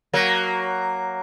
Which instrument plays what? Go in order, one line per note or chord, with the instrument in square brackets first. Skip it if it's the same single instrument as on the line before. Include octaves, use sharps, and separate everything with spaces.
[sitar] F#3 A#3